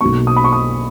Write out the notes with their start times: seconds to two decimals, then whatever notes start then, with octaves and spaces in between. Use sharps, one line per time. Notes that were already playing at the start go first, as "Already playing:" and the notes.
0.01 B1 B2 F#3 A#3 C#6
0.27 D#6
0.36 B5
0.44 C#6
0.52 D#6